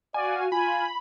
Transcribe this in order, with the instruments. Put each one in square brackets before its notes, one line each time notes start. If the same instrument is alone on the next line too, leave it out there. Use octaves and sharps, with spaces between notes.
[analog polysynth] F#4 F5 [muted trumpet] D5 [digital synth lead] G#5
[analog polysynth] F4 [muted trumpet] G#5 [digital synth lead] B5